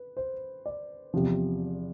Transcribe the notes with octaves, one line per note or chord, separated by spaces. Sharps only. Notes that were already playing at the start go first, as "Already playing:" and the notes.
Already playing: B4
C5
D5
E2 C3 F3